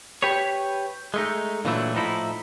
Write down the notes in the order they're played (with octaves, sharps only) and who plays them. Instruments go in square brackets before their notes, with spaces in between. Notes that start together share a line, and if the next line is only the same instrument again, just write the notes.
[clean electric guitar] G4 B4 C#5
G#3 A3 D#4
A#2 D3 E3 F#3 A3 E4
A2 F3 D#4 E4